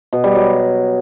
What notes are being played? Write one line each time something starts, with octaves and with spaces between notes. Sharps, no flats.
B2
G3
F#3